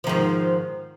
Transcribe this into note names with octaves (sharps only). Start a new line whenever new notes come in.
G#2 D#3 F3